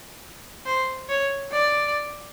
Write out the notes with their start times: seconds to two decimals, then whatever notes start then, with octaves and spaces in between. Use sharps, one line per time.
0.66 C5
1.09 C#5
1.52 D5